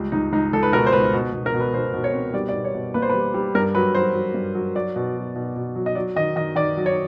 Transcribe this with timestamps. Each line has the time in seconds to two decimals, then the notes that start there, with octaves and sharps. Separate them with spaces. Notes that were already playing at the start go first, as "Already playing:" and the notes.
Already playing: C#2 G3
0.12 C#2 D#4
0.32 C#2 D#4
0.53 C#2 A4
0.63 B4
0.72 B2 A#4
0.86 C5
0.93 C#2 B4
1.13 B2
1.33 B2
1.46 A#4
1.54 B2
1.60 B4
1.73 B2 C5
1.93 B2
2.04 C#5
2.13 C4
2.33 G3 D5
2.49 D5
2.53 B2
2.64 C#5
2.74 B2
2.94 A#3 B4
3.02 C5
3.09 G3 B4
3.34 G3
3.55 G2 A#4
3.75 F#3 B4
3.95 F#3 C5
4.15 F#3
4.34 G2
4.55 F#3
4.75 F#3 D5
4.96 B2
5.16 F#3
5.36 B2
5.56 B2
5.75 F#3
5.86 D#5
5.95 F#3 D5
6.16 D#3 D#5
6.36 D#3 D#5
6.56 D#3 D5
6.77 F#3
6.86 C#5